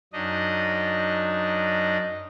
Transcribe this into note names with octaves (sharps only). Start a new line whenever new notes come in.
F#2 D4 D#4 D#5